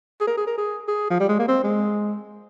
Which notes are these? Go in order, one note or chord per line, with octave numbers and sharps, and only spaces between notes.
G#4
A#4
G#4
A#4
G#4
G#4
F3
G3
G#3
A#3
C4
G#3